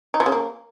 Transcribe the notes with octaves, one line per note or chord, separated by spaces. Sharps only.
D#4
F3
C#3
A#3